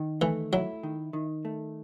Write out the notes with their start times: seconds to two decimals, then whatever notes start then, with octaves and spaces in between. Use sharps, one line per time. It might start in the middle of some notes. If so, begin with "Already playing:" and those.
Already playing: D#3
0.21 E3 A3
0.53 F#3 E4
0.83 D#3
1.13 D#3
1.45 A3